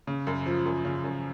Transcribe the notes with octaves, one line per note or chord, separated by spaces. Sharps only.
C#3
F#2
F3
F#2
C#3
F#2